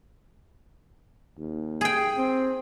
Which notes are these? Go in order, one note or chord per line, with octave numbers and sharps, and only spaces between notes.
D#2
G#4 G5
C4